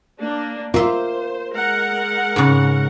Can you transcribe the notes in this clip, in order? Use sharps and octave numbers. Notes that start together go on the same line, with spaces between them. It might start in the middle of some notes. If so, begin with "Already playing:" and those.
A#3 D4
A#3 F4 C5 E5 C6
G#3 A#4 F#5
G#2 C#3